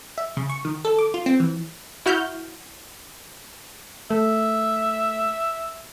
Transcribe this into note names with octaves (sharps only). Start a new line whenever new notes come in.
E5
C#3
C#6
D#3
A4
D6
F4
C4
E3
E4 F#4 F6 G6
A3 E5